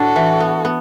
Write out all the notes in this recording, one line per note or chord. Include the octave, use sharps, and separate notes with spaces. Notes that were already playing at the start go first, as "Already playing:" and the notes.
Already playing: A2 D4 F#4 A4
E3
B3
B3